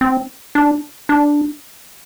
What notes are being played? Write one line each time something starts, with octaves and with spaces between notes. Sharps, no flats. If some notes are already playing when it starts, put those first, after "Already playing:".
C4
D4
D4